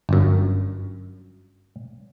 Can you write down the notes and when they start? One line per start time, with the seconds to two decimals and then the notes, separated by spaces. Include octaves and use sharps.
0.09 G1 F#2